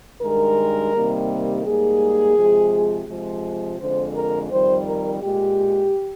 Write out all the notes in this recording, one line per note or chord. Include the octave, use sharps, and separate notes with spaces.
G2 D#3 G#3 A#4
C3 D#3 G3 A#3
G#2 G3 A#3 G#4
C3 F3 G#3
C3 F3 G#3
F2 D3 G#3 C5
A#4
F2 D#3 G3 C5
A#4
A#2 G#3 G4